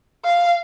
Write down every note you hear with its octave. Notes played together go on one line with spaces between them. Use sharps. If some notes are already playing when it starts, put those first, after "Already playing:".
F5